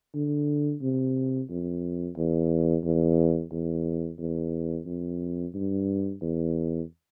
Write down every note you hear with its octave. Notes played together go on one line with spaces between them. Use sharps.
D3
C3
F2
E2
E2
E2
E2
F2
G2
E2